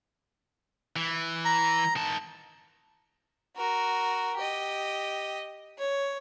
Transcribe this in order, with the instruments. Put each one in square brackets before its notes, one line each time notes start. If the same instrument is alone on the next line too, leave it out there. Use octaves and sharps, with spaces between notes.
[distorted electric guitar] E3
[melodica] A#5
[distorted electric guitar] D#3 A5
[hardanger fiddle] F#4 A#4
G4 D#5
C#5